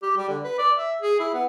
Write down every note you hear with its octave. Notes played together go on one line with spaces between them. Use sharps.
G4
G3
D3
B4
D5
E5
G#4
E4
B3